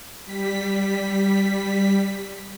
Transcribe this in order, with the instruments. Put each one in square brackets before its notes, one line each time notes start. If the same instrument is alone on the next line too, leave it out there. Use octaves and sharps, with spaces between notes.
[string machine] G3 B6